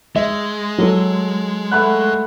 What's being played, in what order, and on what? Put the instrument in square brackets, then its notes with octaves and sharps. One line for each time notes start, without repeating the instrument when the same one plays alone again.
[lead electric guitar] G#3 [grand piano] E5
[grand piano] F#3 A4
[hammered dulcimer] A3 B4 F#5